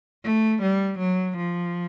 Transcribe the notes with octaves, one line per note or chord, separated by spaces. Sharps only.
A3
G3
F#3
F3